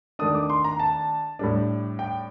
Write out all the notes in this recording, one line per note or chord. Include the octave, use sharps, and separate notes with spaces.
D#3 A3 D4 D#6
D6
C6
A#5
A5
A2 G3 D4
G5